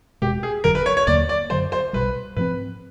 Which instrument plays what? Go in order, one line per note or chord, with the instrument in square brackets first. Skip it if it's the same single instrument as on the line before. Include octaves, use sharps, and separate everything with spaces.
[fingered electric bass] E1 E2 B2 G#3 [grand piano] G4
[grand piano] G#4
[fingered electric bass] F1 F2 D3 F#3 [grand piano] A#4
[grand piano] B4
C#5
C#5
[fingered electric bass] D#2 D3 F#3 A#3 [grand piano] D5
[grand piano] D5
[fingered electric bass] F#2 D3 F#3 [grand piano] C5
[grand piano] C5
[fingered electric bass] B1 B2 G3 [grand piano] B4
[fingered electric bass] G#2 F3 A3 C4 [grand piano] B4